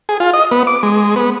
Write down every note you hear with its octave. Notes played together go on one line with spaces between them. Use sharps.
G#4
F4
D#5
B3
D6
G#3
B3